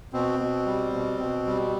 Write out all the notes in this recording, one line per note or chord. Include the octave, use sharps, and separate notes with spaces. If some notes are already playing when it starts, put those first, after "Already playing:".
B2 C4
B2
G3
B2
B2
G3